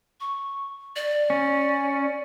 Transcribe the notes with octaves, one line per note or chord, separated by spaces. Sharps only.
C#6
D5
C#4